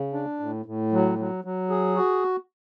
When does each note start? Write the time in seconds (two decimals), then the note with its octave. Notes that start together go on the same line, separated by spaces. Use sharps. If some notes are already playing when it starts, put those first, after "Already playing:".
Already playing: C#3
0.13 D4
0.40 A2
0.66 A2
0.92 F#3
1.18 F#3
1.44 F#3
1.70 G#4
1.96 F#4